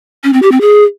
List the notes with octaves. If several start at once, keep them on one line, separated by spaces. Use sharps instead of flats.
C#4
C4
G4
C4
G#4